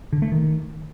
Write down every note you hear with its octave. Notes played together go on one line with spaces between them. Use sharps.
D3
A3
D#3